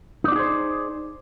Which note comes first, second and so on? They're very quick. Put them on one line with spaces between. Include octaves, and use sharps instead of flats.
D#4 D5 F#4 G#4 C5